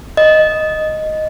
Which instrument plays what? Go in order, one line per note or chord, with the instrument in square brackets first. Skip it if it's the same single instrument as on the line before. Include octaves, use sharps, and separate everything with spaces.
[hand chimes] D#5